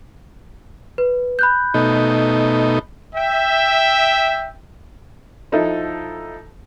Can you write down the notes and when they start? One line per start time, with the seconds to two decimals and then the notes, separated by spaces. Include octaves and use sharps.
0.98 B4
1.39 B5 F#6 G6
1.74 B2 A3 D#4
3.16 E5 G5
5.52 F3 D#4 E4 A4 D#5